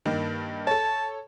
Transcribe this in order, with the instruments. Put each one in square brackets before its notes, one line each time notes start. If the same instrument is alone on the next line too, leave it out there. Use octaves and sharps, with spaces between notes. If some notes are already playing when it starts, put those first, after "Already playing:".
[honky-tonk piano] G2 D#3 A#3
[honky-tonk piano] A4 C#5 [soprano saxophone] A5